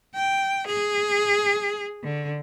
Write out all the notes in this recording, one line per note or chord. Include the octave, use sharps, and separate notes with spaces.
G5
G#4
D3